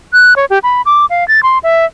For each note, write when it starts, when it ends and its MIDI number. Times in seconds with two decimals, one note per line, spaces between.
0.13 0.34 90
0.36 0.45 73
0.50 0.59 67
0.63 0.82 83
0.86 1.06 86
1.10 1.27 77
1.28 1.40 93
1.43 1.58 84
1.63 1.85 76